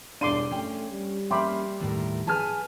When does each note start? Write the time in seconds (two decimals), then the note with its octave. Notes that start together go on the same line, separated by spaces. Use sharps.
0.21 E1 G2 D4 D5 C6 D6 D#7
0.51 A3 C#4 G5
0.91 G3
1.31 A#3 C#4 E5 G5 B5 C6 D6
1.80 D#2 A2 A#4
2.27 G#4 B4 G#5 A5 F6